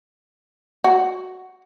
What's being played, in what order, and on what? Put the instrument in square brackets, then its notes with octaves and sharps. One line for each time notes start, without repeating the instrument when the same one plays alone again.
[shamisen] F#4